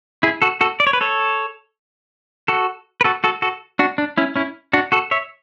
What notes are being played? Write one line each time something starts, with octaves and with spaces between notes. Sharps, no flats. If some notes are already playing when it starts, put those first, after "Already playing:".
E4 G#4
F#4 A4
F#4 A4
D5
C#5
B4
A4 C#5
F#4 A4
B4
F#4 A4
F#4 A4
F#4 A4
D4 F#4
D4
C#4 E4
C#4 E4
D4 F#4
F#4 A4
C#5 E5